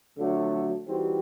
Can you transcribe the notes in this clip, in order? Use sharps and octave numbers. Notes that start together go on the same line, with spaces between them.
F2 D3 F#3 A3
E3 G3 C4 D#4 F#4